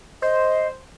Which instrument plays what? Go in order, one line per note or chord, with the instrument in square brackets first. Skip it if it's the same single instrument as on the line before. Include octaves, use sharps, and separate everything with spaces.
[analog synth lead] C5 [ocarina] D#5